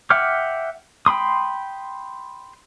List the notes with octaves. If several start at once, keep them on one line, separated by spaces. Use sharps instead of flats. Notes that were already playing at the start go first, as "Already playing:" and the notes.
E5 F#5 G5 D6 F6
G5 B5 C6 D#6